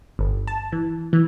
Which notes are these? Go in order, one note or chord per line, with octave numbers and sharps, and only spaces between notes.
G1
A5
E3
E3